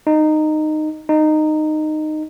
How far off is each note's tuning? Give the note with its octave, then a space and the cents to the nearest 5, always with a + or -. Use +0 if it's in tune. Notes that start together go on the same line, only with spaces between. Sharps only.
D#4 -15
D#4 -15